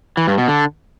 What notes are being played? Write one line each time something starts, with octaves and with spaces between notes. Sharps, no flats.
E3
G2
B2
D3